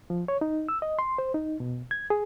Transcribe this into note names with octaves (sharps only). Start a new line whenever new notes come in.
F3
C#5
D#4
E6
D#5
C6
C5
D#4
B2
G#6
G#4